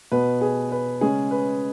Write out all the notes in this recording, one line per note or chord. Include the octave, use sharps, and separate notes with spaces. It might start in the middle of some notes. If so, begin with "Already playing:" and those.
B2 B3 B4
G#4
B4
C#3 G#3 C#4 G#4
B4